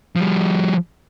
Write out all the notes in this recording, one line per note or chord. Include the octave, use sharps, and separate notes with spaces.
F3 G3